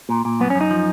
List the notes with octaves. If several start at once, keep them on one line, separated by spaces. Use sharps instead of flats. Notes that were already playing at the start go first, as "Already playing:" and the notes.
A#2
A#2
F#2 B3
C#4
F#2
D#4
F3